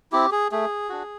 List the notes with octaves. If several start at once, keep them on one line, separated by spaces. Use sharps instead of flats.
C4 E4 G4
G#4
A3 G#4
D4 F#4